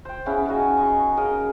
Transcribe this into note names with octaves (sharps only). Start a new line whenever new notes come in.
C5 G5
C#3 B3 C#4 E4
C#3 D#4 F#4 G#5
G#4 D#5 C#6
C#3 A#4 D#5